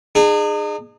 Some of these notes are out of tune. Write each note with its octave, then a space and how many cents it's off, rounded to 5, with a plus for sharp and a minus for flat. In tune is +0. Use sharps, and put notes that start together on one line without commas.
D#4 -45 G#4 -5